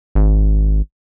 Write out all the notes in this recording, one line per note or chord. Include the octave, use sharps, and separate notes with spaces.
G#1